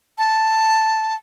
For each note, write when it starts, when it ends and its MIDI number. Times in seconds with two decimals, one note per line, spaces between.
0.18 1.15 81